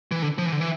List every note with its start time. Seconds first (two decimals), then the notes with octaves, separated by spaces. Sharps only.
0.11 E3
0.22 D3
0.38 F3
0.46 E3
0.52 D3
0.60 E3